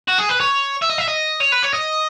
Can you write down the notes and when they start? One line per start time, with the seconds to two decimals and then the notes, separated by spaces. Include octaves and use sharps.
0.08 F#4
0.18 G#4
0.29 B4
0.40 C#5
0.82 E5
0.89 D#5
0.98 E5
1.07 D#5
1.40 C#5
1.52 B4
1.62 C#5
1.73 D#5